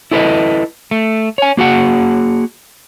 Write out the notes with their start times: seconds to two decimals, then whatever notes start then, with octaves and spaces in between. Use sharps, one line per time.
0.11 E4 A4 B4 D5 D#5
0.91 A3
1.38 C#5 G#5
1.57 A#3 F#4 G#4 F#5